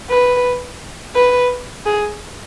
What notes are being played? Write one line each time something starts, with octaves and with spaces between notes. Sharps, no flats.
B4
B4
G#4